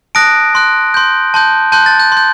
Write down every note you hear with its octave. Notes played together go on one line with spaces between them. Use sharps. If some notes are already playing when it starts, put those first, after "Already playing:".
A5 D#6 F#6 A#6 D7
C6 F#6
C6 G6
A5 C6 G6
A5 C6 F#6 G6
A6
G6
C6
G6